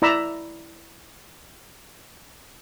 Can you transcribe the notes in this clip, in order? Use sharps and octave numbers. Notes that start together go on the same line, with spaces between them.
E4 D5 A#5 B5 E6